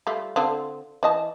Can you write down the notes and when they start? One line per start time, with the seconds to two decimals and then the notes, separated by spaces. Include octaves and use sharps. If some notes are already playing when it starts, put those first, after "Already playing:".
0.07 G3 A3 F4
0.36 D3 C4 F4
1.03 E3 D#5 A5